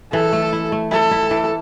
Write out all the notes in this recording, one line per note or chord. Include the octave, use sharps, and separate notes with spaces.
E3 A4
A3
E4
A3
E4 A4
E4
E3